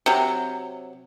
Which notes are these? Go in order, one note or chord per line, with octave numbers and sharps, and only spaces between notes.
C3 F#3